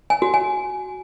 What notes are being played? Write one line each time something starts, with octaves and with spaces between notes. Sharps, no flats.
G#5
F#4
G#5